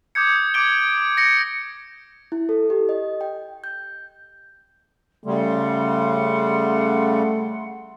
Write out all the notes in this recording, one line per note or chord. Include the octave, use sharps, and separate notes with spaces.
D6 D#6 G6 G#6 C#7
D6 G#6 D7 G7
A#6 C#7
E4
A4
G4
D#5
G5
G6
C#3 G3 A3 F#5 C6